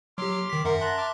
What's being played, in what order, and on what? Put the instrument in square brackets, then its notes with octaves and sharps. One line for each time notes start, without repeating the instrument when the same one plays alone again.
[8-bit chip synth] F#3 G4 [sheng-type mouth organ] C6 D6 F6
[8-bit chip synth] D#3 B6
[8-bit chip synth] F#2 E5 F#5 [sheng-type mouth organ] A#4 C6
[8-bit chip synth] E5 C6 [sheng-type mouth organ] A5 A#5 F#6
[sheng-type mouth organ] A5 D6 F6